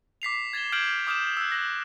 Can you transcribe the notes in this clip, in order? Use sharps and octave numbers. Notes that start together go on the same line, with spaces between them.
D6 B6 C7 F7
G#6 A6 E7 G7
F6 G6 G#6 D7 E7 F#7
D6 D#6 F6 G6 E7
E6 F#6
F#6 A#6